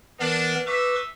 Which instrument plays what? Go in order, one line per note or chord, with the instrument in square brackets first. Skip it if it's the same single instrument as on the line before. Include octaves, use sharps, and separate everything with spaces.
[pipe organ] E3 B3 A#4 [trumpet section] G#3 D4
[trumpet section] D#4 E5 [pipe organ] B4 C#6 D6